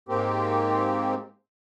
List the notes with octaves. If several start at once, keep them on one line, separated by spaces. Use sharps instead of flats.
G#2 A#3 C4 G4